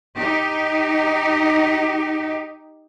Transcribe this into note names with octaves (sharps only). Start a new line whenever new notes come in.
D#4 G4